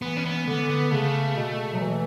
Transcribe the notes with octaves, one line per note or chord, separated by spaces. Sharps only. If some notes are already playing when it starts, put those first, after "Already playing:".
E3 B3
C#4
B3
D3 B3
B3
C#3 A3
B2
F#3
E3